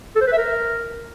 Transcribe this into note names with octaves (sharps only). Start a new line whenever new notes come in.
A4
C5
B4
E5
A#4